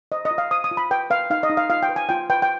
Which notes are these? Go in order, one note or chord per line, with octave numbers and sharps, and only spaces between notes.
C5 D#5
D#5
F4
F5
C5 D#6
D#6
F4
B5
B4 G5
B4 F5
D#4 F5
D#5
D#4
F5
F4 F5
G5
B4
G#5
F4 G5
B4 G5
G5